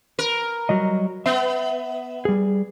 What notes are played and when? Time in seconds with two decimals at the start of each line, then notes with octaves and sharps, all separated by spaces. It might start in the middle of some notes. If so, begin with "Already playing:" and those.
0.19 A#4
0.69 F#3 G3 D#5
1.26 B3 E5
2.25 G3 G#4